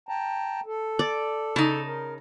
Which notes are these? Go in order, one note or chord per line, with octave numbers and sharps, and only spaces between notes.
G5 A5 A#5
A4
D5
C#3 D#4 A5
A#4